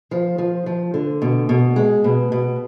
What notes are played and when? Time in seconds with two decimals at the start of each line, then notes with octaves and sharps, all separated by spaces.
0.11 F3
0.38 F3
0.66 F3
0.94 D3
1.22 B2
1.49 B2
1.76 G#3
2.04 B2
2.32 B2